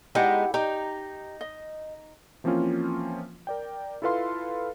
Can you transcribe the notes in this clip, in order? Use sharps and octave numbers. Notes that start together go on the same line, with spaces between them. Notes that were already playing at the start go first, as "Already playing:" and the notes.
G#3 B3 D#4 E4 G4 F#5
D#4 G4 A#5
D#5
E3 F3 A#3 C4 C#4 F4
A#4 D5 G5
E4 F4 A4 B4 F5 C6